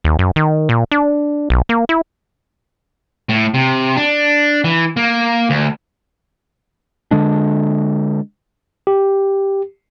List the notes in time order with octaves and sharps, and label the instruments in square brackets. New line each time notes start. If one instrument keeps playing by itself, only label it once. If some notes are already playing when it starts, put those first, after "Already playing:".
[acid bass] D#2
F#2
D#3
A#2
D4
B1
A#3
E4
[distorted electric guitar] A2
C3
D4
E3
A#3
D2
[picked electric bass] D3 G#3 D4
[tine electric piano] G4